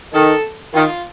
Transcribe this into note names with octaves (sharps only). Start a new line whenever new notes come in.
D#3 A4
D#3 F4